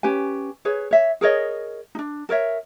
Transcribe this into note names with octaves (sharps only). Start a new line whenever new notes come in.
C#4 G4 B4 G#5
G#4 B4 C#5
C#5 E5
G#4 A#4 C#5 D#5
D4 D#4
A4 A#4 C#5 E5